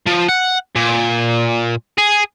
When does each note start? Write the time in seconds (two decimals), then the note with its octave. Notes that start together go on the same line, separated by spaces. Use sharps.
0.06 F3
0.29 F#5
0.76 A#2
1.98 G#4